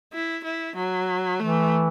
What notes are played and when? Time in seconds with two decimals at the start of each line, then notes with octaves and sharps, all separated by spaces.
0.13 E4
0.44 E4
0.76 F#3
1.39 E3 A3